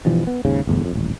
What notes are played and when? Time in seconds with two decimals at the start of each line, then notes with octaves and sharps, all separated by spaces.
0.05 G2 B2 E3 F3
0.27 B3
0.45 D#2 G#2 C#3
0.67 G1 E2 A2
0.81 F2 A2
0.93 D#1 A1